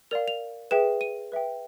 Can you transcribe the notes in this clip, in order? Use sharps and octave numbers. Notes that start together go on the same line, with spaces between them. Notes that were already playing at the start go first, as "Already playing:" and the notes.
A#4 D5 F5 F7
F7
G#4 B4 E5 G5 E7
D#7
B4 E5 G5